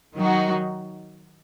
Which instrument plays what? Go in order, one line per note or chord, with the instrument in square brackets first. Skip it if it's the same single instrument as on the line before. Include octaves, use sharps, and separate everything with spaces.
[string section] D#3 F#3 D#4 F#4